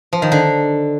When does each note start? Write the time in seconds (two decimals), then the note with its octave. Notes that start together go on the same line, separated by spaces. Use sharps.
0.13 F3
0.22 D#3
0.32 D3